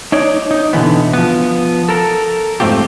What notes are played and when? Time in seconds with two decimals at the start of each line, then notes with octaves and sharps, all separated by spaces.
0.12 D#4 C#5 D5
0.51 D#4
0.73 B2 D3 E3 B3
1.13 F3 B3
1.89 A4 A#4
2.60 F2 G#2 A3 C4 F4 G4